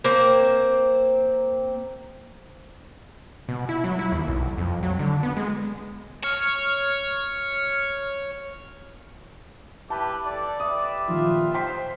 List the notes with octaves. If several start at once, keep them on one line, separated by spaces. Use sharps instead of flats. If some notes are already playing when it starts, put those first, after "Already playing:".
A#3 C4
B2
E4
F#3
E4
D#2
B1
F2
F#3
D3
B3
G#3
C#5 F6
E4 G4 B4 A5
A4 D5
G4 B4 E5 D#6
A#2 D#3 F3 F4
C5 G5 C6 B6